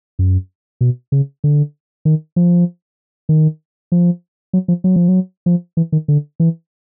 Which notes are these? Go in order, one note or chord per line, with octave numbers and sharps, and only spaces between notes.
F#2
B2
C#3
D3
D#3
F3
D#3
F3
F#3
F3
F#3
F3
F#3
F3
E3
D#3
D3
E3